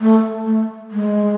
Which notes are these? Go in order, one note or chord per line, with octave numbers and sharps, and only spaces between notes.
A3
A3
G#3